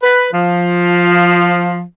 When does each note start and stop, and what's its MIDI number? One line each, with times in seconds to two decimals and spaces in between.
0.03 0.28 71
0.33 1.82 53